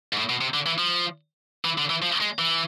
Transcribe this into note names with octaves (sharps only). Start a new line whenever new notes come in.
G#2
A2
B2
C3
D3
E3
F3
E3
D3
E3
F3
G#3
E3